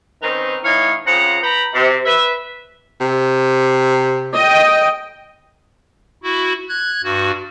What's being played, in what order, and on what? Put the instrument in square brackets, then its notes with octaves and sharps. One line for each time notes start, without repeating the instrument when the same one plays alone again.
[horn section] D#3 C4 C#4 D#4 A#4 B4
A2 E3 D#4 C#5 F5 G#5
C#3 F3 C4 F#5 A#5
B4 G5 A#5 B5
C3
B4 E5
[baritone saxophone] C3
[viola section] D#5 G5
[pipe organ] E4 F#4
F#6 G#6
G2 F#4